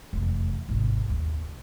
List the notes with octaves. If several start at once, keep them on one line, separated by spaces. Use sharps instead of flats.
F1 E2
G#1 C3
F#1 D#2